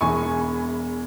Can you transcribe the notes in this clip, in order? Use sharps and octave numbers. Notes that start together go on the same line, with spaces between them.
E1 E2 E3 G#5 C#6